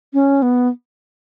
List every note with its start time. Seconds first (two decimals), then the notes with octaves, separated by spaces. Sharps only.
0.13 C#4
0.42 B3